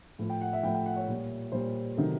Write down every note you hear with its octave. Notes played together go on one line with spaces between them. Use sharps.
A2 F3 A3
G5
F#5
E5
A2 F3 A3 G5
G5
F#5
C#5
A#2 G3
A#2 G3 C5
C3 D#3 F#3 A3